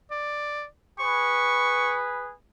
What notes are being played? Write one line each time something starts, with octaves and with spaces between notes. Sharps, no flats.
D5
G#4 B4 C#6